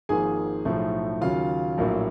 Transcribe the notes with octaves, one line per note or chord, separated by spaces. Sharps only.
G#1 G#2 F3 A#3 G#4 G#5
B1 A2 F3 A3
D#2 C#3 F#3 F4 F5
A#1 A2 F#3 A#3